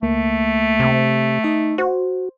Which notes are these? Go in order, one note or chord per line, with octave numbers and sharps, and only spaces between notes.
C#2 A3 A#3
C3
D#4 D#5 E5
F#4 C5